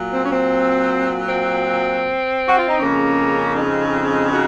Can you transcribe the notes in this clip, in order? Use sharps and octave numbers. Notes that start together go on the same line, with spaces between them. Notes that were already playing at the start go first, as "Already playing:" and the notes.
Already playing: A#2 F#3
C4
C#4
C4
C4
F#4
F4
D#4
F2 C#3 G#3 A#3 C#4
C4 D#4
D#4 F#4